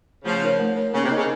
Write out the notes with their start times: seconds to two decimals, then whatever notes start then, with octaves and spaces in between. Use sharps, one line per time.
0.24 C#3 F3 A3
0.42 D#4 A#4 C#5
0.60 A3
0.76 D#4 A#4 C#5
0.94 C#3 A#3
1.05 C3
1.11 D#4 A#4 D#5
1.17 C#3